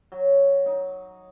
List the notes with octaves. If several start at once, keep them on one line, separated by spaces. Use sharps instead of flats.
F#3
D#4